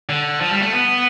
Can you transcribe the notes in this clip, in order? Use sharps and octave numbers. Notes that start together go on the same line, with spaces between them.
D3
F3
G3
A3
B3